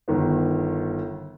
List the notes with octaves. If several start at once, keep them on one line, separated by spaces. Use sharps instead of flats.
G1 D#3 B3